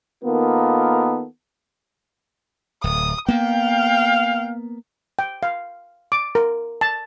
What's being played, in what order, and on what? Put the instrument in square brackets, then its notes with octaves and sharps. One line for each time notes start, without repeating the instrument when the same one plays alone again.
[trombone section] D#3 A#3 B3 F4 A4 A#4
[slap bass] D1 [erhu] D#6
[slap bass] A#3 B3 [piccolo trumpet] F5 [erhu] G5
[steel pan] G5
F5
D6
A#4
A5